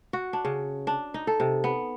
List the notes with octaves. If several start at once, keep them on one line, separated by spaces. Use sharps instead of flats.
F#4
D4
C#3
D4
D#4
A4
C3
B3